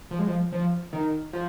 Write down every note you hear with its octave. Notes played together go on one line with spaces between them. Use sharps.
F3
G#3
F3
F3
D#3
F3